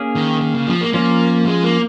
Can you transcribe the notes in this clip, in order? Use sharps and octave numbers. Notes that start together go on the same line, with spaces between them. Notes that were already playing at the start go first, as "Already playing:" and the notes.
Already playing: A#3 C#4 G#4
D#3
D#3
C#3
F3
A#3
F3 A#3 C#4 F4
G#3
A#3